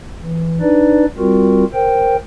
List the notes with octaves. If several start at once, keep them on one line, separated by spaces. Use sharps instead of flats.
E3
D4 D#4 B4 D5
G3 C4 F4 F#4 A#4
A#4 C5 G5